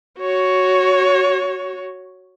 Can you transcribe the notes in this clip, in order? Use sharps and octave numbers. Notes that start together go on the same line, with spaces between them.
F#4 C#5